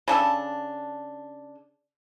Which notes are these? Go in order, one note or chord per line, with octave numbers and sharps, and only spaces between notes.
C#3 D4 A4